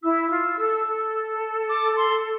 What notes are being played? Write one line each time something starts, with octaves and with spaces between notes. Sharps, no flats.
E4 E6
F4
A4
A4
D6
C6